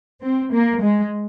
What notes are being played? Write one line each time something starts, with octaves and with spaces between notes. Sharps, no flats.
C4
A#3
G#3